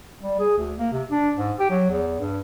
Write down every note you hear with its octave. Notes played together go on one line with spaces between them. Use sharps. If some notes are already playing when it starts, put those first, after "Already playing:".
G3
G#4
D2
A#3
C3
D4
G#2
G4
F#3
E2
G2